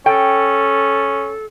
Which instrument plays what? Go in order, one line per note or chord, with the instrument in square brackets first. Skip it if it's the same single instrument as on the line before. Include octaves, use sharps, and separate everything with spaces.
[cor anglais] C#4 [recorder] A4 [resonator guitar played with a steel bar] G5